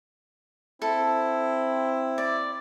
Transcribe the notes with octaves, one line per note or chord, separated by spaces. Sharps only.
C4 E4 A4
D5